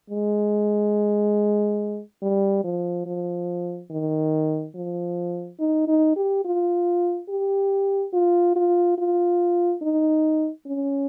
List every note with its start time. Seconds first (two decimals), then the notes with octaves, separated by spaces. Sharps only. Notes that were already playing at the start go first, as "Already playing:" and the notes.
0.10 G#3
2.22 G3
2.64 F3
3.06 F3
3.91 D#3
4.75 F3
5.60 D#4
5.88 D#4
6.16 G4
6.45 F4
7.29 G4
8.13 F4
8.56 F4
8.98 F4
9.82 D#4
10.66 C#4